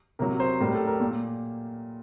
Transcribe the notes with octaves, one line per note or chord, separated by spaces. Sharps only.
C3 F#3 A#4
C5
A2 G3 A#4
A4
A#4
A#2